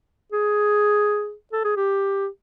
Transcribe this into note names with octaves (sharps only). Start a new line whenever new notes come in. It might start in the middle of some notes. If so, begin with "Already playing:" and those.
G#4
A4
G#4
G4